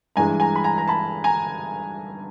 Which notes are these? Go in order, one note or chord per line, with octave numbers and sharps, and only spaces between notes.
G2 E3 G#3 G#5 A#5
G#5 A#5
B5
G#5 A#5
A#5
A5 B5
G#5 A#5